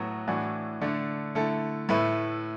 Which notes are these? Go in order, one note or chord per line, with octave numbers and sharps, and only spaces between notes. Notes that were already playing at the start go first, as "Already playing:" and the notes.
Already playing: A2 F#3 B3 F#4
A2 E3 D4 F#4
D3 A3 D4
D3 A3 E4 A4
A2 A3 E4 B4